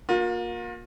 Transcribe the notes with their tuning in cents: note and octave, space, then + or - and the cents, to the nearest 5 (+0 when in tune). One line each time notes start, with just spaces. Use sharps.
A#3 +15 F4 +45